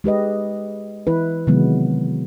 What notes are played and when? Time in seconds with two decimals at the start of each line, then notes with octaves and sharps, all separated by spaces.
0.04 G#3 G4 B4 D#5
1.07 E3 E4 B4
1.47 C3 D#3 E3 F#3 G#3 B3